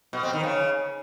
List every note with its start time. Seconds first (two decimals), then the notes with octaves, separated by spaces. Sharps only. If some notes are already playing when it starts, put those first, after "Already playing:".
0.13 B2
0.23 C4
0.33 D#3
0.43 C#3